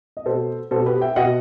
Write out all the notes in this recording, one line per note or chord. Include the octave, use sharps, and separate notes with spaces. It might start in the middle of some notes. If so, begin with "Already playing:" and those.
D#5
B2 A4 C5
B2 A4 C5
G4 B4
E5 G5
B2 D#5 F#5